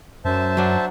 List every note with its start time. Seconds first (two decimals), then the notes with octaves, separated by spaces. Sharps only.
0.25 F#2 C5 E5 A5
0.57 F#3 D4